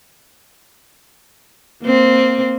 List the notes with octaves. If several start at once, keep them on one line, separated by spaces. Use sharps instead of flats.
A#3 C4